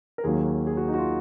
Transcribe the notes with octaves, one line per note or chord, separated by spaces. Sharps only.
A#4
D#2 D#3 F#3 A#3 G#4
G#4
F#4
D#4
F#4
F4